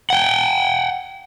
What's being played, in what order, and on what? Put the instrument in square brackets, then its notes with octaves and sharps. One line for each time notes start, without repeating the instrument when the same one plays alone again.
[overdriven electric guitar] F#5 G5